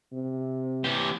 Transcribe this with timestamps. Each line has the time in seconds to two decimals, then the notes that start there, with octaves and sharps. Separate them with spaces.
0.13 C3
0.84 E3 G4